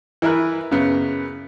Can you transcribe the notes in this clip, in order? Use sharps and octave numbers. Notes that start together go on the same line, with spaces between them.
E3 E4 A#4 B4 F#6
F#2 C#3 B3